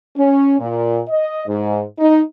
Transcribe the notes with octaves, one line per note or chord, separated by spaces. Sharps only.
C#4
A#2
D#5
G#2
D#4